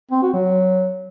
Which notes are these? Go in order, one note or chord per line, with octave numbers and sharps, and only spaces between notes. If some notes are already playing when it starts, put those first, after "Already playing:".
C4
F#4
F#3